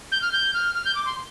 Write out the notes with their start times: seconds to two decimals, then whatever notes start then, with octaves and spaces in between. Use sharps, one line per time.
0.12 G6
0.22 F6
0.33 G6
0.54 F6
0.75 F6
0.85 G6
0.95 D6
1.06 C6